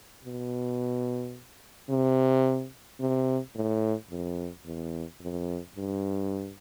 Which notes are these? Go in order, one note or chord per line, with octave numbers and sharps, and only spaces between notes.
B2
C3
C3
A2
F2
E2
F2
G2